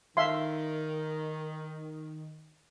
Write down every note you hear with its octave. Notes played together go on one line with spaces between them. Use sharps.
D#3 E5 F5 C6